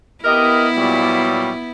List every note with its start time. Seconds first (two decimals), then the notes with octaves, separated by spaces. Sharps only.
0.24 B3 E4 G4 A#4 D#5
0.77 A#2 F#3 G3